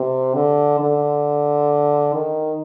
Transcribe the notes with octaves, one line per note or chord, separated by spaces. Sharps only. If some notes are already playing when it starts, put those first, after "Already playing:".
Already playing: C3
D3
D3
D#3